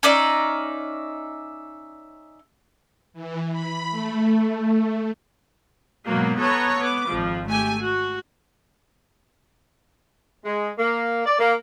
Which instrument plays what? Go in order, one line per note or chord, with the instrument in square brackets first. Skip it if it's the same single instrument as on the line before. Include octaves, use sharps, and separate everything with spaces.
[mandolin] C#4 D#4 D5 E5
[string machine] E3
B5
A3
[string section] G#2 B2 F#3 A#3
B3 A4 C#5 A#5
B3 D6
G#1 F2 F3
A3 G4 G#5
F#4
[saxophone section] G#3
A#3
D5
A#3